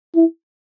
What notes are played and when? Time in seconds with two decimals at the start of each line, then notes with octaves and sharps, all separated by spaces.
0.16 E4